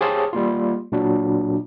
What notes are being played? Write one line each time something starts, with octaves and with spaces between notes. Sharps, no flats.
G4 G#4 C5 C#5 F5 A5
G3 A#3 F4
A#2 F#3 D4 F#4